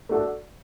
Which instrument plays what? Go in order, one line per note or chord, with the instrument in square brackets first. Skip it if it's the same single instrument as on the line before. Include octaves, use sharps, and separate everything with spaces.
[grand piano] A3 D4 F#4 A4